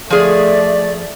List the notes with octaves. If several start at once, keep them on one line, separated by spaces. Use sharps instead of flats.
F3 A3 G#4 D5